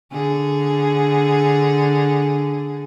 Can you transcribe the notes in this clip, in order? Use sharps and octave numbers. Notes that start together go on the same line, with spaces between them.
D3 G#4